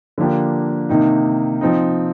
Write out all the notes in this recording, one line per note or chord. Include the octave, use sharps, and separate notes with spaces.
D3 F3 A#3 D4 G4
C3 D#3 A#3 D#4
F3 C4 D#4